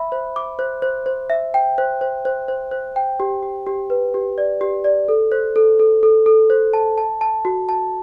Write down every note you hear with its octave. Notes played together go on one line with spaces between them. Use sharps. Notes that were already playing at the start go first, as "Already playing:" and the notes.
Already playing: E5 B5
C5
D6
C5
C5
C5
E5
G5
C5
C5
C5
C5
C5
G5
G4
G4
G4
B4
G4
D5
G4
D5
A4
C5
A4
A4
A4
A4
C5
A5
A5
A5
F#4
A5